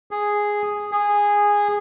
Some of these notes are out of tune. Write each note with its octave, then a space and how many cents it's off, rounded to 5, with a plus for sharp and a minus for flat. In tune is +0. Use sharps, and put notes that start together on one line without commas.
G#4 -5
G#4 -15